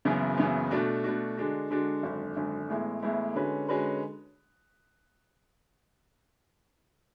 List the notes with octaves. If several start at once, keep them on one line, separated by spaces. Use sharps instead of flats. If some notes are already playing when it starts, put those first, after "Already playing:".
F#1 F#2 C#3 E3 B3
F#1 F#2 C#3 E3 B3
B2 A3 D4 F#4
B2 A3 D4 F#4
D3 G#3 D4 F#4
D3 G#3 D4 F#4
G#1 F#2 D3
G#1 F#2 D3
A1 A2 G#3 B3 E4
A1 A2 G#3 B3 E4
D3 G#3 C#4 F#4 B4
D3 G#3 C#4 F#4 B4